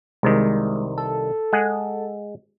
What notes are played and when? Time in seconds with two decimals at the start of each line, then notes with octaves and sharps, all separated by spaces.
0.23 C2 C3 D#3 G#3
0.98 A4
1.53 G#3 G#4 F#5